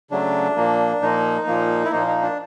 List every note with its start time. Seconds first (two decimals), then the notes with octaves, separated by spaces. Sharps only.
0.11 C#3 F#3 A3 D4
0.56 A#2 F3 A#3
1.01 A#2 F3 A#3 D#4
1.46 A#2 F3 A#3
1.85 E4
1.92 A#2 F3 A#3 D#4
2.07 D#4
2.22 D4